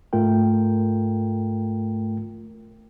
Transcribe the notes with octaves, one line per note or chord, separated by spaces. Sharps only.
G#2 A3 F4 A#4 G5